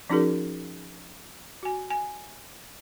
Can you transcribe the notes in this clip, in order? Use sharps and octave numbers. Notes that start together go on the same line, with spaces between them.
F3 C#4 D#4 F#4 G#4 A#4
F#4 G#5
G#5